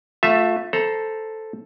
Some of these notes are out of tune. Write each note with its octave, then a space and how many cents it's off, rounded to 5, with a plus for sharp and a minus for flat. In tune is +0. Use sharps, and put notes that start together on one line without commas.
A3 +0 F4 +25 E5 +0
A4 +0 C5 +0 A#5 +20